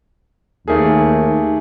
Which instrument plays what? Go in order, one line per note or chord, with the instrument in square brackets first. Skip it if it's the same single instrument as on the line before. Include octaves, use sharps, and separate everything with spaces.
[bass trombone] D#2 [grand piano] A3 A#3 G#4